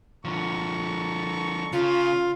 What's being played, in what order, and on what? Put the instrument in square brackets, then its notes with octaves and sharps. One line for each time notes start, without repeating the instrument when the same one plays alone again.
[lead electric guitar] D3 F3 [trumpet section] A4 A#5 C#6
[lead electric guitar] C#3 [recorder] F4